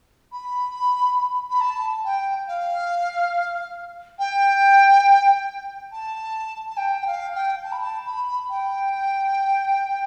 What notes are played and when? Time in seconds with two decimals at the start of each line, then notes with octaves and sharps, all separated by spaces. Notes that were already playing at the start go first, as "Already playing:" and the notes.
0.32 B5
1.50 B5
1.61 A5
2.05 G5
2.47 F5
4.19 G5
5.92 A5
6.70 A5
6.77 G5
7.01 G5
7.06 F5
7.35 G5
7.64 A5
7.72 B5
7.81 A5
8.06 B5
8.50 G5